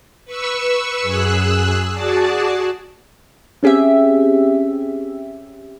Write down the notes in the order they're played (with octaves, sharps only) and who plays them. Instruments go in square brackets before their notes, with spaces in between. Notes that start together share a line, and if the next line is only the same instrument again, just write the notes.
[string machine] B4 C#6 E6
F#2 G#4 E6 F#6
F#4 G#4 D5 A5
[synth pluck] C4 C#4 G4 G#4 E5